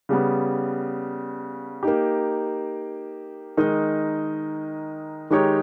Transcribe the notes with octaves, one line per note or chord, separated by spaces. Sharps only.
C#3 G3 B3
A#3 D#4 G4
D#3 G#3 D#4 A#4 D#5
D#3 G#3 D#4 G4 C#5